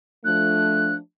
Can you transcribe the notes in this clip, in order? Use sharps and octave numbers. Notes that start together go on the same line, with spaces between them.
F3 A3 D4 F#6